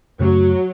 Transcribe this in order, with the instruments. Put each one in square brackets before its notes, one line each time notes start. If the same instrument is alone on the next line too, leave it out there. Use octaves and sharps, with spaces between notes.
[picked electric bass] F#2 C#3 A3 [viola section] F#3